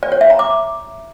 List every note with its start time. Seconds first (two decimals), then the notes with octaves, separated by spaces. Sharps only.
0.03 D5
0.12 C#5
0.21 E5
0.30 A#5
0.39 D6